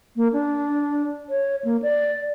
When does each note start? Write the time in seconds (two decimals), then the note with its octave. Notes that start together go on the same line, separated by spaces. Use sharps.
0.16 A#3
0.33 D4
1.29 C#5
1.65 A#3
1.82 D5